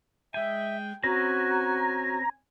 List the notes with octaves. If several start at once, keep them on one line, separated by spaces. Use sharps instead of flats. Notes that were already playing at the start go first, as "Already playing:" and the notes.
G#3 E5 G5 G#5
C4 C#4 F#4 B4 G#5 A#5